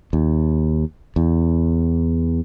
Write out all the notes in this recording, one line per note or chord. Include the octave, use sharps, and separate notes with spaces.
D#2
E2